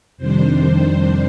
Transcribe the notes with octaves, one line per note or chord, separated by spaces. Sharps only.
F2 C3 D#3 G3 D4 C5